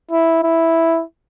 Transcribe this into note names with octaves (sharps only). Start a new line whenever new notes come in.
E4
E4